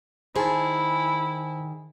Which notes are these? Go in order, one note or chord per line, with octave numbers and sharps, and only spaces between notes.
D#3 E4 G#4 C5 G#5 A5